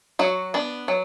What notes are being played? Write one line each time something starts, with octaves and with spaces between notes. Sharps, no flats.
F#3 F#4
B3 D4
F#3